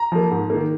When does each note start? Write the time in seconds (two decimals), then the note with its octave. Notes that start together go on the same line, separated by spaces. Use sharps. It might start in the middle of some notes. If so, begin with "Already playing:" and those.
Already playing: A#5
0.12 F3 A#3
0.31 G#2
0.50 D#3 A#3